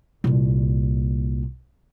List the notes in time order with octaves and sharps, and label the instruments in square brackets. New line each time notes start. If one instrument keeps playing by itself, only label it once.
[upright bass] C2 A#2